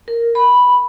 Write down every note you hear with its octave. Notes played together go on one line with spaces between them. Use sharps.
A#4
B5